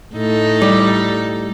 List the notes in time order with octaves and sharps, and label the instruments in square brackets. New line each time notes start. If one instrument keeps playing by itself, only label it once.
[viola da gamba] A2 D#4 A4
[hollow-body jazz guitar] G3